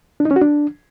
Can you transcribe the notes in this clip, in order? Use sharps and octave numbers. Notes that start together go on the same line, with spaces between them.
D4
D#4
C#4
F#4
D4